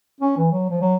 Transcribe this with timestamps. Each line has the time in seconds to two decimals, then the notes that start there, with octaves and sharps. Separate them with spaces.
0.20 C#4
0.38 E3
0.51 F#3
0.70 F3
0.81 F#3